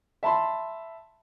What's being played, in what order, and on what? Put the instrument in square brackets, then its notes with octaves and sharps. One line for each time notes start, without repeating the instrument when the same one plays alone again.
[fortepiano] E5 A5 B5 C6